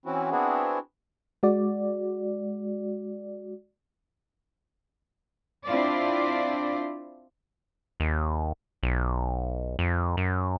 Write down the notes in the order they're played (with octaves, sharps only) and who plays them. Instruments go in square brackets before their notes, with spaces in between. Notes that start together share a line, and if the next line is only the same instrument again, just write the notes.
[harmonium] E3 C4 C#4 E4 F#4
B3 C4 D4 E4 F#4 G#4
[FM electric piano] G#3 F#4 D5
[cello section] C4 D4 E4 F4 C5 D5
[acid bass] D#2
B1
F2
F#2